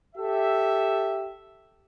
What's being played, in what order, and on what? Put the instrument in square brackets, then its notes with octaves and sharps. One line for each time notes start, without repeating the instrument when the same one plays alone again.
[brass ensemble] G4 A4 E5